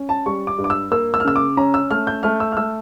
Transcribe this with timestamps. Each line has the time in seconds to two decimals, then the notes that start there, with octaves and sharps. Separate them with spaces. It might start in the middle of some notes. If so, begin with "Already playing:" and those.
Already playing: C#4
0.09 A5
0.26 G3 C#6
0.47 D6
0.58 G2
0.64 D6
0.70 E6
0.91 A#3 E6
1.14 E6
1.20 F6
1.25 C#3 E6
1.36 D6
1.57 C#4 A#5
1.74 E6
1.91 A3 F6
2.07 G6
2.23 A3 F6
2.40 E6
2.52 F6
2.57 A3 E6